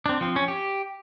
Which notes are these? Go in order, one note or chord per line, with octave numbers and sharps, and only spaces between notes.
C4 D4
F3 C4
C#4
G4